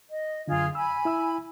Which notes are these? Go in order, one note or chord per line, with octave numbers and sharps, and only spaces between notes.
D#5
F#2 D3 F4 G#4
G#5 B5 E6
E4 E5 E6